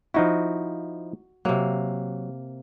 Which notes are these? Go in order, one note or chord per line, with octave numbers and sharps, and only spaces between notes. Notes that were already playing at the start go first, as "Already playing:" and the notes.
F3 D#4 E4 F#4
C3 F#3 A#3